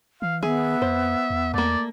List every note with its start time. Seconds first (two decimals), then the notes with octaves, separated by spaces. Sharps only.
0.22 E3 F5
0.43 D#3 B3 G#4 E5
0.82 F2 C5
1.30 E2
1.54 E2 A3 A#3 D5